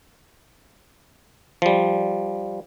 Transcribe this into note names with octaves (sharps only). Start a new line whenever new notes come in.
F3 G3